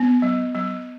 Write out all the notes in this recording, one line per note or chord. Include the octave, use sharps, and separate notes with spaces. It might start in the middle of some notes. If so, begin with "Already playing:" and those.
Already playing: B3
F#3
F#3